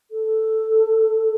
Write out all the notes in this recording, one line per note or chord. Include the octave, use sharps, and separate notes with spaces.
A4